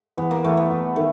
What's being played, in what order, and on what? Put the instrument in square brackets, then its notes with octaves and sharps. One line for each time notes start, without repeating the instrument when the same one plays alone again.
[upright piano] E2 [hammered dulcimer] B3
[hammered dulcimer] A#3
[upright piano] E2 [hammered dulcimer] A3
[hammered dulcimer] B3
[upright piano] E2
[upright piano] D#3 [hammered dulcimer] A3